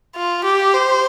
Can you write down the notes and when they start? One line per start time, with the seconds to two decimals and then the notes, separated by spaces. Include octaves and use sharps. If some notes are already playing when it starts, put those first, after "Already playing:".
0.16 F4
0.44 G4
0.74 C5